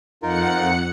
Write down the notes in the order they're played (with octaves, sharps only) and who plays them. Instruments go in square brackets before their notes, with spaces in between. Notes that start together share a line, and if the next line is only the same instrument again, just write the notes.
[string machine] F2 F#5 C#7 [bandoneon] D#4 F4 A#4